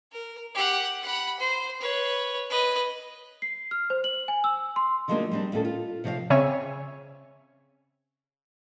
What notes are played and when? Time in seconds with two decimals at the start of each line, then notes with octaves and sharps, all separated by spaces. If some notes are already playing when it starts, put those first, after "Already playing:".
0.12 A#4
0.54 G4 F#5
1.03 F#5 B5
1.40 C5
1.81 B4 C#5
2.50 B4 D#5
3.42 C7
3.71 F6
3.90 C5
4.04 F#7
4.28 G#5
4.44 E6
4.76 C6
5.08 D#3 F3 F#3 G#3 A#3 D4
5.31 G3 C4 D4
5.52 D#2 A#2 A3 C#4 A4
5.65 F4
6.04 C3 F3 C#5 D5 F5
6.30 C#3 C4 C#5 E5 G#5 C#6